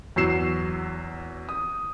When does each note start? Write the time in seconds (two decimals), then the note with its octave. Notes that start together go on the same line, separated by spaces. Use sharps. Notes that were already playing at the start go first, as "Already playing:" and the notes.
0.16 E2 F#3 E6 C7 E7
1.49 D#6